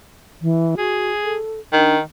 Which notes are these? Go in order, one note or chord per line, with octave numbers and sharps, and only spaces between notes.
E3
F#4 G#4
A4
D#3 D4